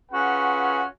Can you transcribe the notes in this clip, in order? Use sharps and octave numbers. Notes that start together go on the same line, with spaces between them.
C#4 F4 F#4 G#4 B4 F#5